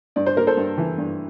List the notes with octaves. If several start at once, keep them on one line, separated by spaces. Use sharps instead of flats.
G2 D5
C5
A#3 A#4
A4 C5
G2
E3
G2